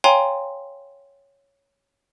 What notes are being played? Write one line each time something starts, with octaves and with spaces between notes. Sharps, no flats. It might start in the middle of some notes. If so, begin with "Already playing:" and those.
C#5 F5 G5 G#5 A#5 C6